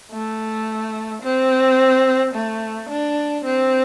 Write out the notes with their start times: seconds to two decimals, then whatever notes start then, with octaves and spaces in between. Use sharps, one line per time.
0.12 A3
1.22 C4
2.34 A3
2.90 D4
3.45 C4